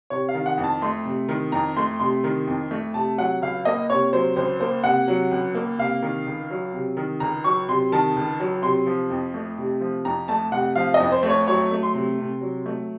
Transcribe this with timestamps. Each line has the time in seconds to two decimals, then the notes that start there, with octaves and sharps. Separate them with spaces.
0.10 C3 C#5
0.29 F5
0.34 D#3
0.46 F#5
0.58 F2
0.64 A5
0.82 A3 C6
1.05 C3
1.29 D#3
1.52 F2 A#5
1.76 A3 C6
2.00 C3 C6
2.24 D#3
2.48 F2
2.71 A3
2.94 C3 A5
3.18 F#3 F#5
3.42 C#2 F5
3.65 A#3 D#5
3.90 C3 C#5
4.13 F#3 C5
4.36 C#2 C5
4.60 A#3 C5
4.84 C3 F#5
5.08 F#3
5.31 C#2
5.55 A#3
5.78 C3 F5
6.02 D#3
6.26 C#2
6.50 F#3
6.74 C3
6.97 D#3
7.20 C#2 A#5
7.44 F#3 C#6
7.69 C3 C6
7.92 D#3 A5
8.16 C#2
8.40 F#3
8.62 C3 C6
8.86 F3
9.10 F2
9.34 A3
9.58 C3
9.81 F3
10.05 F2 A#5
10.28 A3 A5
10.52 C3 F#5
10.76 F3 F5
10.94 D#5
11.00 F2
11.12 C5
11.23 A3
11.29 C#5
11.48 F#3 C#5
11.71 A3
11.83 C6
11.94 C3
12.19 C3
12.41 F#3
12.66 A3